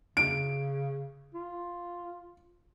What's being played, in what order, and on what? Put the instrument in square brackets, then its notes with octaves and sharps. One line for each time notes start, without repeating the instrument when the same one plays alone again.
[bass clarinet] C#3 [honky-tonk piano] D7
[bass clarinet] F4